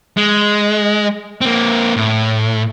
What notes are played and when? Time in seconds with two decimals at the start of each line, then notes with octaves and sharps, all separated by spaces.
0.17 G#3
1.41 A#3 C4
1.96 A2